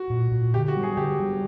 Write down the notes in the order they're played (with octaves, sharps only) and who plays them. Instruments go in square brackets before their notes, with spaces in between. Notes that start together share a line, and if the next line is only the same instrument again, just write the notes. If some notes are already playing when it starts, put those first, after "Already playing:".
Already playing: [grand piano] F#4
[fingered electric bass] A#2
A#2
[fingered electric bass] D3 [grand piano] G4
[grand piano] F#4
[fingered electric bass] G3
[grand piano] G#4
[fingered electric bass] D3 [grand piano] G4
[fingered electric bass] G3